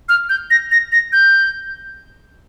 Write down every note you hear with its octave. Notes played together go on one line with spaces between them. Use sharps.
F6
G6
A#6
A#6
A#6
G6